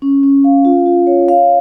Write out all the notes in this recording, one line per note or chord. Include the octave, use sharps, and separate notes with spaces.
C#4
C#4
F5
F4
F4
C#5
F5